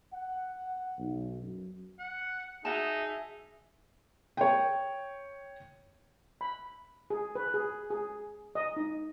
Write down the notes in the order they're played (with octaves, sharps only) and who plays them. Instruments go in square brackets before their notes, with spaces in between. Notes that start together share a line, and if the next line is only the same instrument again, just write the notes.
[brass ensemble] F#5
B1
F#2
[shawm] F#5
[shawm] D#4 [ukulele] F#4 F#5 A5 [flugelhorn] G#4 [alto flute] E5
[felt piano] C#5 G5
[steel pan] B5
G#4
B4
G#4
G#4
D#5
D#4